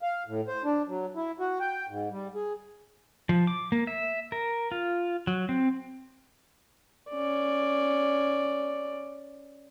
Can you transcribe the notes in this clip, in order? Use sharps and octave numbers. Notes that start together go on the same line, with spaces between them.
F5
A2
C5
D4
F#3
E4
F#4
G5
G#2
G3
G#4
F3
D6
A#3
E5
A#4
F4
F#3
C4
C#4 D5